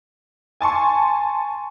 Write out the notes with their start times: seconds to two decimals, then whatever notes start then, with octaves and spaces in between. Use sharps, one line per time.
0.61 G#5 A5 C6 C#6